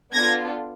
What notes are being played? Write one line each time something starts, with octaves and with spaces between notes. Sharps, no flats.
B3 D4 F4 A4 G#6 A#6